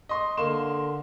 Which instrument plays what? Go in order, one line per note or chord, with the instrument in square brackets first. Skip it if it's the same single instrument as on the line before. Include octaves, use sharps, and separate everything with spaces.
[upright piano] D#5 C6
[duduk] D3 [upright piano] A#3 C6 E7